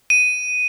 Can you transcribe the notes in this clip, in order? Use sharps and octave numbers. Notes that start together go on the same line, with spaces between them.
D#7